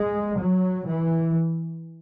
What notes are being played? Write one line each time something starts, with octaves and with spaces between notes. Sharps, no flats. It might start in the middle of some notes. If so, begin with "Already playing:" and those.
Already playing: G#3
F#3
E3